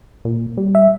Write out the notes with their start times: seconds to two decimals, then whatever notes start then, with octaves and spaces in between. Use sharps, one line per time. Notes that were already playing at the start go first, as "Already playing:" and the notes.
0.25 A#2
0.57 G3
0.75 E5